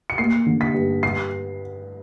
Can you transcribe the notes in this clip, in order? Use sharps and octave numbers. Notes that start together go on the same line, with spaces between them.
C#7
A#3 C7
D3
B6
G2
G3 C7